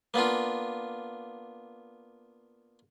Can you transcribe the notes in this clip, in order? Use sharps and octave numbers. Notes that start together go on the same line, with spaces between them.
A#3 B3 D4 F4